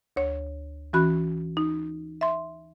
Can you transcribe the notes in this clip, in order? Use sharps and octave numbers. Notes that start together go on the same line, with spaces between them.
D2 C#5
E3 C#4 F#4 B5 F#6
D#4
E5 C6